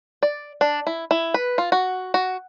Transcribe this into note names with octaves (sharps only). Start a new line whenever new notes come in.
D5
D4
E4
E4
B4
F4
F#4
F#4